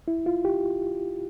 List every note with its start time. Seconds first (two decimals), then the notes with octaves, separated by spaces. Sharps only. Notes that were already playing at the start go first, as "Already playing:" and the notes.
0.08 E4
0.26 F4
0.45 G4